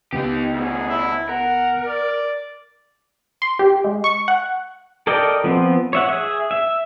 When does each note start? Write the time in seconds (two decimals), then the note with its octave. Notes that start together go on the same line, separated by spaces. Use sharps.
0.12 C#2 B3 D#4 G4
0.53 D2 B2 G#4
0.89 E4
1.29 A#4 F#5
1.87 D5
3.42 C6
3.59 G4
3.84 G#3
4.04 C#6
4.28 F#5
5.07 A4 A#4 D5 D#5 G5
5.44 F3 B3 C4
5.93 C#5 E5 F#5
6.09 G#4 E5
6.51 E5